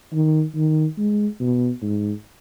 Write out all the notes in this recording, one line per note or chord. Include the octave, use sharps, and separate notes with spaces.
D#3
D#3
G#3
B2
G#2